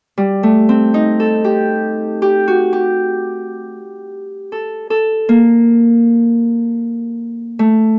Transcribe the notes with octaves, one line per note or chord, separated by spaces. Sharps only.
G3
A3
C4
D#4
A4
G4
G4
F#4
G4
A4
A4
A#3
A3